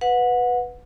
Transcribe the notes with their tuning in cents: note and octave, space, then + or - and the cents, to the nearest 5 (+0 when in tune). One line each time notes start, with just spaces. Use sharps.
B4 +0 F#5 -25